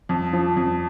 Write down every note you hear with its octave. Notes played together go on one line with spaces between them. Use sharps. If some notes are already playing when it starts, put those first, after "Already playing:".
F2
F3
F2